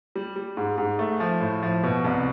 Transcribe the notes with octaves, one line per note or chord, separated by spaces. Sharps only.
G3
G3
G#2
G#2
A3
F3
A2
F3
B2
C2